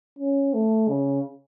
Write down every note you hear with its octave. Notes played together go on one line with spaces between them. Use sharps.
C#4
A3
C#3